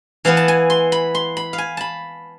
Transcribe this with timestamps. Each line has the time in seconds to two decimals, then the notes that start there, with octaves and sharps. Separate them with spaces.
0.25 E3 B3 E4 F5
0.37 A5
0.48 G#5
0.70 C6
0.92 B5
1.15 C6
1.37 B5
1.53 F5
1.58 G#5
1.77 A5 B5